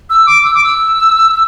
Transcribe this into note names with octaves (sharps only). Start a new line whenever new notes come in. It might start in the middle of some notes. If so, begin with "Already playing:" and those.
E6
D6
E6
D6
E6